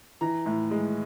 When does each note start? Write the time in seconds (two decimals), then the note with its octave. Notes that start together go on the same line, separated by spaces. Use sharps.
0.21 E3 A#5
0.46 A2
0.71 G#3